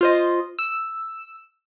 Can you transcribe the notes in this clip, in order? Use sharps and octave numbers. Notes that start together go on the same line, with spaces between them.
F4 C5 D#5
E6